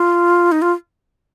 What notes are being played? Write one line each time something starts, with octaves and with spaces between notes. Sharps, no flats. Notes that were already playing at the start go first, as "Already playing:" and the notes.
Already playing: F4
D#4
F4